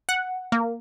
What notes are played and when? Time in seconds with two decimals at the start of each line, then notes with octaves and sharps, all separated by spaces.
0.09 F#5
0.52 A#3